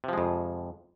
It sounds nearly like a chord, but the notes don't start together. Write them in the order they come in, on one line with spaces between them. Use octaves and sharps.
C3 F3 G#3 F2